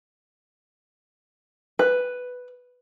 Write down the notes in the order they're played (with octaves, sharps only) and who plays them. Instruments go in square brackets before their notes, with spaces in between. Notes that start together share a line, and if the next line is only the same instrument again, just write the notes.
[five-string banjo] B4